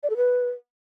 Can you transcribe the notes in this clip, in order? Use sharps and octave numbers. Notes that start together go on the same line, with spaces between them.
D5
A4
B4